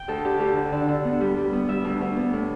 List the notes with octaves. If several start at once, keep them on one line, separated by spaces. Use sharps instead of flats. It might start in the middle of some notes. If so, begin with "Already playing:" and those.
Already playing: G5
D2 A4
D3 G4
D2 G4
D3
D3
D3
B3
G3
G3
B3
G3 E5
D2
D2
B3
A2